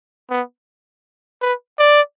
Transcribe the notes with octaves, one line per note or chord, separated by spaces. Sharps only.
B3
B4
D5